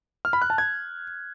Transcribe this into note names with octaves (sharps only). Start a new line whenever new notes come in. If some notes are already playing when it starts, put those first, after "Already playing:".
F6
B5
F#6
A5
G#6